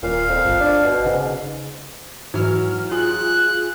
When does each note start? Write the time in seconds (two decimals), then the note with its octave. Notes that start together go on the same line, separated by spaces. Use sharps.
0.03 D#1 A#2 F5
0.29 F2
0.46 G1
0.60 D4
0.84 B2
1.06 G#2 C#3
2.34 G#2 E3 F#3 F6
2.91 F4 G#4 F#6